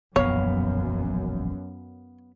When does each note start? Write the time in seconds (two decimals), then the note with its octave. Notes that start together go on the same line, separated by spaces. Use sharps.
0.16 E1 A#1 F#2 B3 C#5 F5